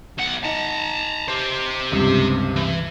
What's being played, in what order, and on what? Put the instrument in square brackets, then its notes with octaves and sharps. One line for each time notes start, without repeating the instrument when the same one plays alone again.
[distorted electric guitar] B1 F#5
[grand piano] D#4 [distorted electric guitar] A5 A#5
[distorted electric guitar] G4 C5
[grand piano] C#2 G2 C3
[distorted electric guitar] E3